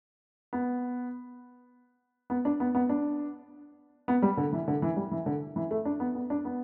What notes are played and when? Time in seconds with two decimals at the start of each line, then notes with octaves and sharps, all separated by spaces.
0.53 B3
2.30 B3
2.45 D4
2.60 B3
2.75 B3
2.89 D4
4.08 B3
4.22 G3
4.37 D3
4.53 E3
4.68 D3
4.82 E3
4.96 G3
5.11 E3
5.26 D3
5.56 E3
5.71 A3
5.85 D4
6.00 B3
6.15 B3
6.30 D4
6.45 B3